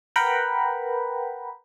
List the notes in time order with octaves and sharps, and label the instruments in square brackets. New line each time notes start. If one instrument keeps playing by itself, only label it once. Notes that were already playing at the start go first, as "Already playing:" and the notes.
[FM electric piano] A#4 B4 F#5 G5 A#5 B5